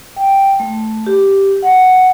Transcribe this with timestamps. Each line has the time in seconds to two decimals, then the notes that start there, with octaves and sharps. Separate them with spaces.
0.16 G5
0.60 A3
1.07 G4
1.63 F#5